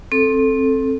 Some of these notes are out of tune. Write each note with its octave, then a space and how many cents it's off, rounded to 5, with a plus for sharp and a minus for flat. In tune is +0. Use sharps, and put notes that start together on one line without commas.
C4 +20 A4 +0